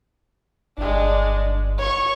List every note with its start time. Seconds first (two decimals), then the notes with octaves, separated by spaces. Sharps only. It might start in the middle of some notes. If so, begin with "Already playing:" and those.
0.78 G1 G#3 D4
1.78 C#5 C#6